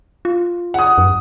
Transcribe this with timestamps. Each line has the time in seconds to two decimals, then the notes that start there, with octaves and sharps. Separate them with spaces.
0.25 F4
0.74 F#5 D#6
0.98 F#2